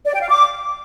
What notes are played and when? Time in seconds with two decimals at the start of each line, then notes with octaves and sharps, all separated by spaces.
0.06 D5
0.14 G5
0.21 F5
0.28 D6